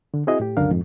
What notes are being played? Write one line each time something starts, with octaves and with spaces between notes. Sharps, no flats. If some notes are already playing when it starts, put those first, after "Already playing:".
D3
C4 E4 F#4 G#4 D#5
A2 G4
C#2 F#2 D3 D4 A#4 F5
F2 G#2